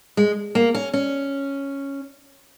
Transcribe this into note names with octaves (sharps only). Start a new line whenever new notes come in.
G#3
A#3
C#4
C#4